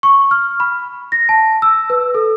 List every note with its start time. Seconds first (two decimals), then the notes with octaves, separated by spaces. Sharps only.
0.03 C#6
0.31 F6
0.60 B5
1.12 A#6
1.29 A5
1.62 E6
1.90 B4
2.15 A4